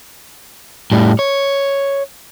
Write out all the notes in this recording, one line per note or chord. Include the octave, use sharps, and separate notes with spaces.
A2 G3
C#5